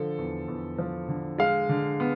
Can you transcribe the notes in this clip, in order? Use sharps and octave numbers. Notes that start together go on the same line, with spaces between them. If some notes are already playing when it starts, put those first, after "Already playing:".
Already playing: D3 F3 A4
E2
E2
F3
D3
G#3 F5
D3
B3